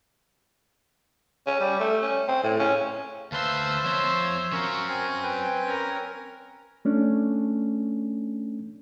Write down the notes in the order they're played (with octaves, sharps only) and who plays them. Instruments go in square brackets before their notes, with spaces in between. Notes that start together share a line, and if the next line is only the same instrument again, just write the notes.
[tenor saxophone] C#4
G3
A3
C#4
C4
A2
C#4
[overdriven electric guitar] D2 C6 [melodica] B4 F5 A5 [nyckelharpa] C5 E5
[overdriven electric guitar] F3 C4 [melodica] C#5 C6
[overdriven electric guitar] C#4 F#4 [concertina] A#4 C#6 [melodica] F5
[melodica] C4 G#5
[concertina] B4 G5
[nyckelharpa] C#4 A#4
[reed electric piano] A3 C#4 D4